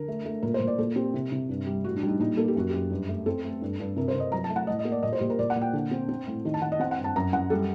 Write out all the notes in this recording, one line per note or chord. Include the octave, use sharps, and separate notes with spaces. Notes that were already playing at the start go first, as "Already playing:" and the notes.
Already playing: D3 A#4
A3
A3
A#2 A#4
C5
A#2
D5
A#2 A4
C4 G4
C3
C3
G2
G3
A2 F#4
D4
G3
D#4
A#2 D#4
A#3 A4
G4
F#2 F#4
F#2 G4
G2
A3
C4 A4
A3
G2
G2
C3 A#4
C5
C3 D#5
F#3 A#5
A5
A3
F#5
A2 D#5
D#5
A#3
D5
A#2 D#5
C5
A#2 G4
A#4
A#2 D5
F#5
A#2
G5
D3
C4
C4
A2
D#3
A5
D#3 F#5
D#5
C4 F#5
F#5
G2
A5
F#2 A#5
F#2 F#5
G3 A4